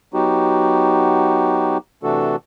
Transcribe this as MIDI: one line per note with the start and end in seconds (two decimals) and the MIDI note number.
0.14 1.77 54
0.14 1.77 59
0.14 1.77 63
0.14 1.77 66
0.14 1.77 67
2.03 2.36 48
2.03 2.36 52
2.03 2.36 57
2.03 2.36 62
2.03 2.36 66
2.03 2.36 69